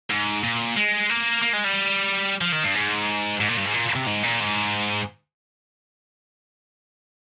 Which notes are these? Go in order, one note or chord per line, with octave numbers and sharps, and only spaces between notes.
G#2
A#2
G#3
A#3
A#3
G#3
G3
F3
D#3
G2
G#2
G#2
A#2
G2
G#2
A#2
C3
G#2
A#2
G#2